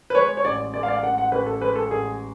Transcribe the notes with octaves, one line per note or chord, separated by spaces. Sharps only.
B4
G#3 C#5
C#5
A1 D5
G#3 D5
F5
D5
A1 F#5
F#5
A1 B4
A4
G#3 B4
A4
A1 G#4